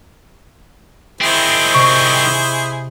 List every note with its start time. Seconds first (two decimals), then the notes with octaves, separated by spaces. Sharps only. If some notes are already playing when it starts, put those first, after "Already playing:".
1.21 D#3 C4 E4 G#4 C5
1.74 C3 D#5 C#6 G6